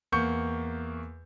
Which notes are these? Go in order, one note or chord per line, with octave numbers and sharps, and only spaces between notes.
E2 A#3 C#6 G6 C#7